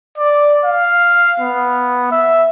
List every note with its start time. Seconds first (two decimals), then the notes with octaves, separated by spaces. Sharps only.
0.18 D5
0.65 F5
1.40 B3
2.12 E5